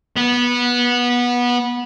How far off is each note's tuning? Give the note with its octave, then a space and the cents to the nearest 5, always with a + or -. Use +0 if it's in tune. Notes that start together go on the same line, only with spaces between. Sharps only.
B3 -20